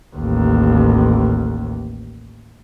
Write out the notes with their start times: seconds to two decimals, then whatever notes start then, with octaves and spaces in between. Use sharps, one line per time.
0.16 A1 D#2